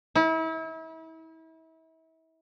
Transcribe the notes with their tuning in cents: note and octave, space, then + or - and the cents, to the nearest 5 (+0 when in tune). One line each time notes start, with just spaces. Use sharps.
E4 -35